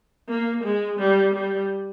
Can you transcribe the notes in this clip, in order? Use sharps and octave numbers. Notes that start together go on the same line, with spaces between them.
A#3
G#3
G3
G3